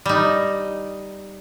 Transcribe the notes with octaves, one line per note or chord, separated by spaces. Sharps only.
G3 D#4